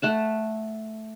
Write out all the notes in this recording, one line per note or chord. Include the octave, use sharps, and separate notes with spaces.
A3 F#5 A5